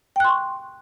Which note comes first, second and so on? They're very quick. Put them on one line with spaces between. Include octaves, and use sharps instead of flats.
G5 F#6 C6 C#6